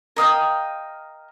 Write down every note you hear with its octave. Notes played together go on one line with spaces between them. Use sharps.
A#4 D#5 F5 G5